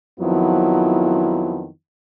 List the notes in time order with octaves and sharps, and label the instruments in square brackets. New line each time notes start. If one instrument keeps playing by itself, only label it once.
[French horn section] F2 D#3 F3 F#3 B3 E4